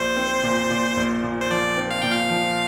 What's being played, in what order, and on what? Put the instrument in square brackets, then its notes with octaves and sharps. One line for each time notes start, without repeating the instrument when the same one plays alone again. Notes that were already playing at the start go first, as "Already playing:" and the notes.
Already playing: [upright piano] A#1 [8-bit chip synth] C5
[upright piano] C4
A#2
A#2
A#1
A#2
[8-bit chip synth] C5
[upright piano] F3 [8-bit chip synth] D5
[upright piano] C4
[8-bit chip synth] F5
[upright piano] A#2 [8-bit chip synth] G5
[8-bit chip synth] F5
[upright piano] F3